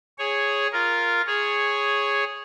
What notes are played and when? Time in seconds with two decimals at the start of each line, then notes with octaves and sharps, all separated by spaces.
0.18 G#4 C#5
0.72 F4 A#4
1.27 G#4 C#5